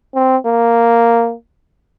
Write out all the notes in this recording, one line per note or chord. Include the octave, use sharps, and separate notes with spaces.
C4
A#3